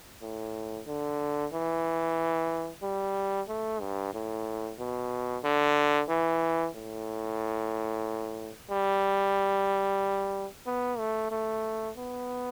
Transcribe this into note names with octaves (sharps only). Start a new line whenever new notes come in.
A2
D3
E3
G3
A3
G2
A2
B2
D3
E3
A2
G3
B3
A3
A3
B3